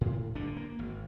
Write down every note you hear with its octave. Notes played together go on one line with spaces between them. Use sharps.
A2
G1 A#2 D3 D4
A#3
G#1